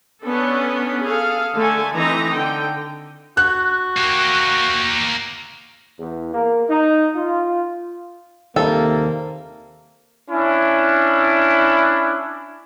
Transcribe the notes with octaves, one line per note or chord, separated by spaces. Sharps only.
B3 C#4 D4 A4
G#4 A4 F5
D3 A3 A4 G#5
E3 C4 D#4 A#5
D3 G5
F#4 F#6
A#3 G4
E2
A#3
D#4
F4
D#2 C3 G3 A#3 D#4 A4 A5
C#4 D4 E4